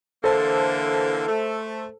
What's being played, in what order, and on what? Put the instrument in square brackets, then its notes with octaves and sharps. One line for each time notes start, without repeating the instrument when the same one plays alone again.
[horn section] D3 E3 A#3 [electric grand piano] A4 C5 A5
[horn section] A3